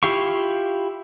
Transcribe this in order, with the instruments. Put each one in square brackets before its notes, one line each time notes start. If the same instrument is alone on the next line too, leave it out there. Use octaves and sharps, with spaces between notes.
[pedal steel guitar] E4 F4 G4 F5 C#6